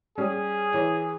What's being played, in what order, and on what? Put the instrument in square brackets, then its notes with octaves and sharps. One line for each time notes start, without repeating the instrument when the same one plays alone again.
[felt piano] G3 C#4 [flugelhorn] G#4
[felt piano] E3 C#5